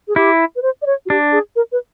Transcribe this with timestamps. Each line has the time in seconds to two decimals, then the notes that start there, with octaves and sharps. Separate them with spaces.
0.08 G#4
0.16 E4 G4
0.56 B4
0.62 C5
0.82 D5
0.86 C#5
1.06 F#4
1.10 D4 G4
1.32 G#4
1.56 A#4
1.72 B4